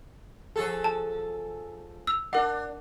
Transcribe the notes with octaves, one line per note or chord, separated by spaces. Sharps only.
F3 G#4 A4
A5
E6 F7
D4 A#4 F#5